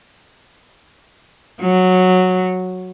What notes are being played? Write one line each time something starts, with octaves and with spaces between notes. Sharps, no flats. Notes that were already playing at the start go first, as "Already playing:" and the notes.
F#3